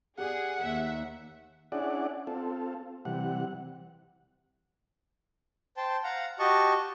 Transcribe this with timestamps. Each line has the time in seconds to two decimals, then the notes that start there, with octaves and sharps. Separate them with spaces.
0.18 G4 G#4 D5 F#5
0.62 D#2 E5
1.72 C#4 D4 E4 G#4 D5 F#5
2.27 C4 F4 A4
3.05 C3 E3 G3 F#5
5.77 C5 G5 A5
6.04 F5 F#5 A#5
6.39 F#4 G4 D#5 A5 C#6